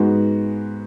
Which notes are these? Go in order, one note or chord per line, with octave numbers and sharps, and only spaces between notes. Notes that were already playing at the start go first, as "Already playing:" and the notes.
Already playing: G#2 G#3 B3 F#4